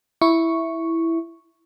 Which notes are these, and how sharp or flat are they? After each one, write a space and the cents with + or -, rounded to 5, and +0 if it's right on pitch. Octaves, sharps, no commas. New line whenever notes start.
E4 +0 C#6 +0